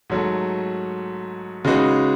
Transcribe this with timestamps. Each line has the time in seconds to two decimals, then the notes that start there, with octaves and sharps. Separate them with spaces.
0.10 G#2 F#3 A3
1.65 C#3 G#3 D#4 F#4 B4